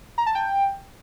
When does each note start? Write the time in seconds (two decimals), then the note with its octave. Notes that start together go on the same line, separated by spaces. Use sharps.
0.18 A#5
0.26 A5
0.35 G5